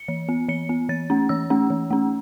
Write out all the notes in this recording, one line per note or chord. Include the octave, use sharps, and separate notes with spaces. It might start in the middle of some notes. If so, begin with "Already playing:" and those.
Already playing: C#7
E3
B3
E3 C#7
B3
E3 A6
A3 C#4
E3 E6
A3 C#4
E3
A3 C#4